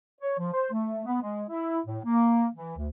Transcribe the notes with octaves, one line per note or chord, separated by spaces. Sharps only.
C#5
F3
C5
A3
B3
G#3
E4
A2
A#3
E3
D2